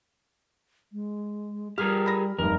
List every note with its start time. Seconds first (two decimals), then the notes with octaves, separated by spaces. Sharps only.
0.93 G#3
1.78 G3 G4 G#4 A#4 F6
2.06 B5 A#6
2.39 F1 G2 D#4 A#4